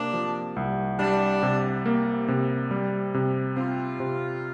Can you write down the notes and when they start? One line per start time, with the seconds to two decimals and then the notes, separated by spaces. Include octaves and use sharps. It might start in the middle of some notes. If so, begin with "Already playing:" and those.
Already playing: C3 A#3 D4
0.14 F3
0.56 C2
0.99 G3 D4
1.43 C3
1.86 A#3
2.28 C3
2.71 G3
3.14 C3
3.57 C4 F4
4.00 C3